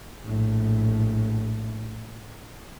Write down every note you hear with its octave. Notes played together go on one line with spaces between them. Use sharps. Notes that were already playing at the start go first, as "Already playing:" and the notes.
A#1 A2